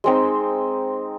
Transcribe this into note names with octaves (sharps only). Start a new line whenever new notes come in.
G#3 C4 D#4